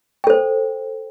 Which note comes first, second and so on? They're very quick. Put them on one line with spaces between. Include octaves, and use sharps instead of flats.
G5 A4 C5